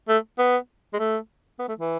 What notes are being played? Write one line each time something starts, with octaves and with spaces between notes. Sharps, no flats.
A3
B3
G#3
A3
B3
A3
E3